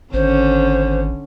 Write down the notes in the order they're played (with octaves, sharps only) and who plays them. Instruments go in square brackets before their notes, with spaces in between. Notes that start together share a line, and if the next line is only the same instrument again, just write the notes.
[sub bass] G#1 [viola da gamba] D3 C#4 [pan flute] C5